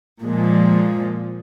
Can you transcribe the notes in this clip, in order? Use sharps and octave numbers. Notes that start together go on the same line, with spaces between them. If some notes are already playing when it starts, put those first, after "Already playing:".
A#2 F3 G#3